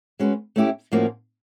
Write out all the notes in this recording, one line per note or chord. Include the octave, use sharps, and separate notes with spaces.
G#3 C#4 F#4 B4
A3 C#4 E4 G4
A2 F3 A#3 C#4 F#4